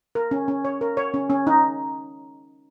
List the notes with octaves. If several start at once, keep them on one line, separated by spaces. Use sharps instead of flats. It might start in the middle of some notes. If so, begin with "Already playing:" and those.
A#4
C#4
C#4
C#5
A#4
C#5
C#4
C#4
D#4